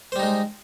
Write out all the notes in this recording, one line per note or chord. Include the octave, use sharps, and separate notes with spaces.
G3 G#3 D#4 C5